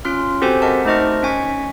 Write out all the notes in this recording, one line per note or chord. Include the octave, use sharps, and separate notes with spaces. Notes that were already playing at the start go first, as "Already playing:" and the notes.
C#4 F4 C6 F6
C4 F#4 G4 A4 C5 G#5
A#4 D#5 F#5 A5
A3 D#4 C5 D#5 C#6 F6
C#4 G#5 C#6 B6